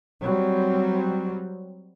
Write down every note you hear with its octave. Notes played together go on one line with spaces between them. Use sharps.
F#3 G3 C4